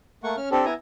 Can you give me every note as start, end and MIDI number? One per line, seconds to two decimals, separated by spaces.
0.24 0.36 57
0.24 0.36 58
0.24 0.36 78
0.24 0.36 85
0.37 0.49 61
0.37 0.49 89
0.51 0.65 60
0.51 0.65 62
0.51 0.65 67
0.51 0.65 69
0.65 0.74 59
0.65 0.74 64
0.65 0.74 80
0.65 0.74 82